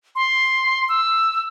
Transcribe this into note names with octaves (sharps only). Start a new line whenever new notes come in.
C6
E6